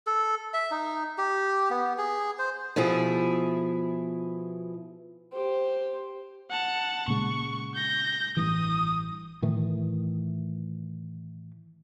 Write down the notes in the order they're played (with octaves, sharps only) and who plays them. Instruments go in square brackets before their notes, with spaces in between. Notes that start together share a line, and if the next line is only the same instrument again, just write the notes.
[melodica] A4
E5
D#4
G4
B3
G#4
C5
[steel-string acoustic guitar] B2 F3 E4 G#4
[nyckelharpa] G4 C5
[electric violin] F#5 A5
[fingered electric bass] A#2 C#3 G#3 [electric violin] C#6
[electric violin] G6 A#6
[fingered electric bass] A1 G2 E3 [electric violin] D#6
[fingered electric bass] A2 D#3 E3 A3